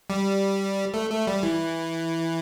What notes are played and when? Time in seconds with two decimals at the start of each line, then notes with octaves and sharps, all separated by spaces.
0.10 G3
0.94 A3
1.10 A3
1.27 G3
1.43 E3